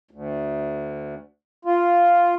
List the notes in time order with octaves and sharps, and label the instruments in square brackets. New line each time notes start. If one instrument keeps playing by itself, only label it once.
[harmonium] D2
F4